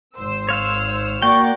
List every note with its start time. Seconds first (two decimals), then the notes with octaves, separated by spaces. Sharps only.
0.17 G#1 C5 E6
0.49 C#5 F5
1.22 A#3 F#4 D5 F#5 G5 C#6